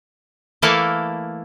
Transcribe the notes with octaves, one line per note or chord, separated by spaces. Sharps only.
E3 A3 A#3 E4 A4 F5